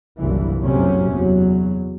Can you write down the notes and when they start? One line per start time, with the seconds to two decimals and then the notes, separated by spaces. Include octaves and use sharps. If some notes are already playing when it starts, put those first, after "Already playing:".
0.20 F#1 C2 G2 A#2 E3
0.63 F#1 A2 C3 F#3 C#4
1.13 E2 F#3